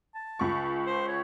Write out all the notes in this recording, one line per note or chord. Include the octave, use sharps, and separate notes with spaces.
A5
C#2 C#6
C5
C#5